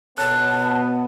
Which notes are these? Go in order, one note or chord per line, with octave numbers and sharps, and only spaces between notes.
B2 B3 C#5 A5 F#6